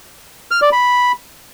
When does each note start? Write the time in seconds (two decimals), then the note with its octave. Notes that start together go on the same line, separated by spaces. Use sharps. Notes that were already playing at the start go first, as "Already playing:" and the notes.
0.51 F6
0.62 D5
0.72 B5